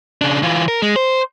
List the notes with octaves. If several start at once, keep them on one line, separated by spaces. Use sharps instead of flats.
C#3 D4
E3 F4
A#4
G#3
C5